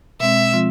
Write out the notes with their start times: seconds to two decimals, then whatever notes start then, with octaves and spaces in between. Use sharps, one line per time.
0.20 B2 G#3 C4 E5
0.53 F3 G#3 C4 F4